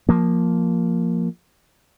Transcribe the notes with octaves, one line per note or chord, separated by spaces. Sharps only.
F3 A#3